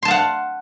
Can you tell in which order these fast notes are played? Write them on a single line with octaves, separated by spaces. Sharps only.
C6 A5 F5 F#5